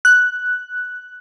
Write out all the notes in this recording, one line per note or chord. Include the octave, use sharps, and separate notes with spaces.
F#6